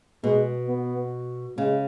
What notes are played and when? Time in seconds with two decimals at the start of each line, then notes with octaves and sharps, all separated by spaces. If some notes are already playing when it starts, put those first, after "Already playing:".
0.23 B2 G#3
0.68 B3
1.57 C#3 G#3